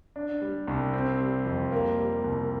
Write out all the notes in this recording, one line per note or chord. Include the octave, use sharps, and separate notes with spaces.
D4
G3
C2
C4
G3
F2
A#3
G3
C2